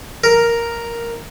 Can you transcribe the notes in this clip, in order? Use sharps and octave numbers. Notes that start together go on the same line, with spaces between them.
A#4